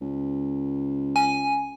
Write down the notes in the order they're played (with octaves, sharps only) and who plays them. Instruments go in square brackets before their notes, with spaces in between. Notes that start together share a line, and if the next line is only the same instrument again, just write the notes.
[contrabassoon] C#2
[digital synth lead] G#5